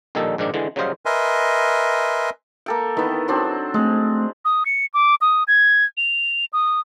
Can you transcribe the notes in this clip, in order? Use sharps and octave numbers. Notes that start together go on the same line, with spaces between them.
A#1 A#2 D#3 G3 D#4 A4
A#1 G#2 D#3 D4
D3 E3 G#3
C#3 F#3 G3 C5 D#5 F5
A#4 B4 D#5 E5 G#5 C6
A#3 A4 G5
D#3 B3 E4 B4
F#3 C4 D4
G#3 A3 C4
D#6
C#7
D6
D#6
G#6
F7
D#6